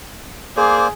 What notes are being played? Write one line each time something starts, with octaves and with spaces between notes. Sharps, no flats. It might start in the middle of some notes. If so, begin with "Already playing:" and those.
A#3 G#4 C5 D5